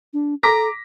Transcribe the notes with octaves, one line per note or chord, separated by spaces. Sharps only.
D4
A4 A#5 D6 A#6 B6